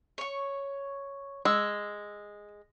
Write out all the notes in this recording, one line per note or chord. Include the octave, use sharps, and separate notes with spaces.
C#5 C#6
G#3 E6